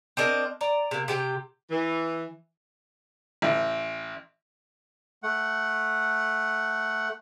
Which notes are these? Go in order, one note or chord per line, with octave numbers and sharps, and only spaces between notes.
C4 D4 A#4 D#5
D5 A#5
C3 A#3
C3 G4 G5
E3
A1
A3 F#5